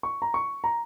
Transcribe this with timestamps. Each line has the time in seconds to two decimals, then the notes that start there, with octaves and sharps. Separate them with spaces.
0.03 C#6
0.22 A#5
0.34 C#6
0.64 A#5